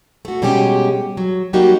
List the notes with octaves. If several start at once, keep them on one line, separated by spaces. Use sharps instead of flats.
A3 F#4
B2 G3 G#3 C#4 G4
F#3
F#3 G3 A#3 D#4 F#4 G4